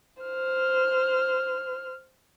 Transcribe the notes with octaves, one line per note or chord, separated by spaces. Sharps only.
C5 F6